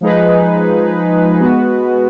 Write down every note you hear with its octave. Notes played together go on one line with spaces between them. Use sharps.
F3 G#3 D#4 G#4 B4
G#3 B3 F#4 B4